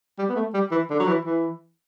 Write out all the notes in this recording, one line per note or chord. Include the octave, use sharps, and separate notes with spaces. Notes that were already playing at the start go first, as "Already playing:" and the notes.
G3
B3
A3
G3
E3
D3
F#3
E3
E3